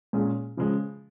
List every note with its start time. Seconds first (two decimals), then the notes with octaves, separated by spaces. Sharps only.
0.13 A#2 G#3 C#4 G#4
0.57 C#3 F3 G#3